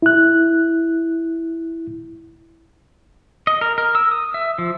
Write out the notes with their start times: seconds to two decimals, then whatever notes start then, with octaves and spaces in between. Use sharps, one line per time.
0.02 E4 F#6
3.47 D#5
3.61 A#4
3.78 A#4
3.95 E6
4.11 D#6
4.34 E5
4.58 F3